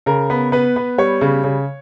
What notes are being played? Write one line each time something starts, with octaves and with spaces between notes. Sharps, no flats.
C#3 A#4
B3
B3 B4
B3
G3 C#5
C#3
C#3